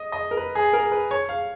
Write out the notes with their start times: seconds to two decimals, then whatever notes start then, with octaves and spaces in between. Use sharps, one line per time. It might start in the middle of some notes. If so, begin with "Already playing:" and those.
Already playing: D#5
0.12 D#5
0.31 A#4
0.37 B4
0.55 G#4
0.73 A#4
0.92 B4
1.11 C#5
1.29 F5